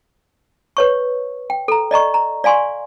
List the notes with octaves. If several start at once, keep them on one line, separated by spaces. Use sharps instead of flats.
B4 C#5 C#6
G5
A4 A#5
D5 D#5 A#5 C#6
A#5
D5 F5 G#5 C6 C#6